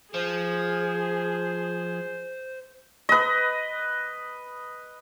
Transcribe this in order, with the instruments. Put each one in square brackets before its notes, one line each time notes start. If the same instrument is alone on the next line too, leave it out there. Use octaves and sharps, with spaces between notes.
[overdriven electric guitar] F3 [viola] G#4 [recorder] C5
[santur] B4 D#5